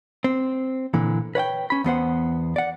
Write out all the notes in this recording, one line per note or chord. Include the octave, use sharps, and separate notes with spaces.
C4
A#2 D3 E3
B4 C#5 F#5 G5
C#4 B5
E2 B3 C5 F#5
D5 F#5